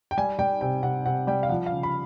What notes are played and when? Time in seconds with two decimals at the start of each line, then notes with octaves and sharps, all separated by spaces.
0.11 G5
0.17 G3 G#5
0.39 G3 G5
0.61 C3 G5
0.83 C3 F#5
1.06 C3 F#5
1.27 G3 G5
1.43 F5
1.49 F3 F#5
1.66 F5
1.72 C#3
1.83 B5